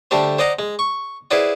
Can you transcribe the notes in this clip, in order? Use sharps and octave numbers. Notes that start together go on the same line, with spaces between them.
D3 G3 A3 G4 C5
C5 D5 D#5 F#5 A#5
G#3
C#6
E4 G#4 B4 C5 D5 F#5